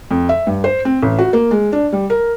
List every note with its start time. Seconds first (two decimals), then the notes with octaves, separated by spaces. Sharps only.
0.11 F2
0.29 E5
0.47 G2
0.64 C5
0.85 C4
1.02 A1
1.19 F#4
1.33 A#3
1.51 G#3
1.72 D4
1.92 G3
2.10 A#4